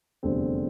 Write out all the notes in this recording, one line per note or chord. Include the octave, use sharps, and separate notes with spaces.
F1 E2 D3 G3 C4